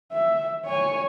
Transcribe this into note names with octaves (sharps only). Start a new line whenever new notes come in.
E5
C#5 G#5